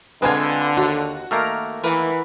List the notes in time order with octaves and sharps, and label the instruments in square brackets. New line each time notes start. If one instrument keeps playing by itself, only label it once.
[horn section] D3 [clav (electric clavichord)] G#3 [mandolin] C4 E4 F4 [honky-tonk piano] B4 G#5 G#6
[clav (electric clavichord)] D#2 [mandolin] F4 [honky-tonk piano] F#4
[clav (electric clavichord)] D#3 A3 A#3 [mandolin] A#4 A#5 F6
[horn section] E3 [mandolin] A#4 B4 F#5